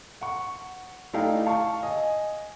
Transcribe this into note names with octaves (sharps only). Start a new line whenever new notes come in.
F#5 C#6
A3 D#4 E4 D5 F5 G5
F5 A5 C#6
D#5 G#5